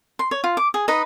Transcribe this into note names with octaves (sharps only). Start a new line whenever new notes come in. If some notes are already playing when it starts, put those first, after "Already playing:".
C6
C#5
F4
D6
G#4
D#4 B4 D#5